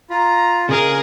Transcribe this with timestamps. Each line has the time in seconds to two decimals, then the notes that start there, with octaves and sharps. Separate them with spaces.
0.10 F4 A#5
0.69 F2 A#2 C#3 G#3 G#4 A#4 D#5 F5